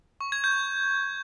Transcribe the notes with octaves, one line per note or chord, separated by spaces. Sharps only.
C#6
G#6
G6